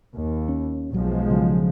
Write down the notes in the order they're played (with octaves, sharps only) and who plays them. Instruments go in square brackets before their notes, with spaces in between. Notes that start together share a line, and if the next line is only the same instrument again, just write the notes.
[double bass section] D#2
[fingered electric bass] C#4
[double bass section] B1 F3 G#3 [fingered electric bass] F#3
[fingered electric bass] C#3 F#3